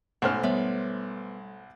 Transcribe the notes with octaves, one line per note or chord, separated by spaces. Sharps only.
B1 G#2 A3 C#4 C5 F6
G3 B3 C#5 E5